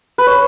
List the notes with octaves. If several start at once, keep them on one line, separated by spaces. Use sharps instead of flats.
B4
C#5